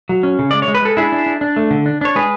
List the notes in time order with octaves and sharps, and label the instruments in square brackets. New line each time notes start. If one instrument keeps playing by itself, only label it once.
[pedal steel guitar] F#3
C#4
C#3
G#3 D5
C#5
G#3
B4
G#3 A4
D4 E4 G#4
D4
D4
D4
A3
D3
D4
D4 C#5
G#3 G#4 B4